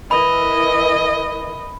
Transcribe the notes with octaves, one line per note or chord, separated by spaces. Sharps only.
E3 E4 A#4 D#5 B5